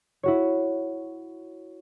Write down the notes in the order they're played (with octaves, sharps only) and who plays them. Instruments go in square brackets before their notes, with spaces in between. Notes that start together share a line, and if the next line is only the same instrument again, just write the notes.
[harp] E4 F#4 C#5